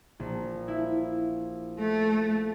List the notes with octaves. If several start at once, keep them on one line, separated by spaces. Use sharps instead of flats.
A#1
E4
A3